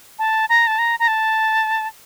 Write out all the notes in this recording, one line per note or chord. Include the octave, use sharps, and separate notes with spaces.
A5
A#5
A5
A#5
A#5
A5